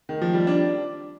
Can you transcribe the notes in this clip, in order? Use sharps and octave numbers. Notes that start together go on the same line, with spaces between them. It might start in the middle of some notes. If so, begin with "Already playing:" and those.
D#3
F3
G3
D4